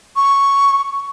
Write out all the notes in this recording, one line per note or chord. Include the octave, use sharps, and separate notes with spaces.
C#6